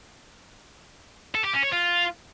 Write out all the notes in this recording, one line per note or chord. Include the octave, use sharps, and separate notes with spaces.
A4
G4
C#4
C#5
F4